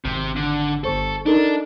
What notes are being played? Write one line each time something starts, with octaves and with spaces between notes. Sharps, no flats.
G#1 C3
D3
G1 A4 C5 C#6
D4 D#4 A4 A#4